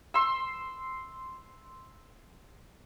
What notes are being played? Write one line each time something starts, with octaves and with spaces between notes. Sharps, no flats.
C6 E6